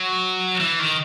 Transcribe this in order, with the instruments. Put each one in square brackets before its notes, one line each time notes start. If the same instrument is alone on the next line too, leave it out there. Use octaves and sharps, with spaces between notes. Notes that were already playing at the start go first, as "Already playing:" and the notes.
Already playing: [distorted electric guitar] F#3
E3
D#3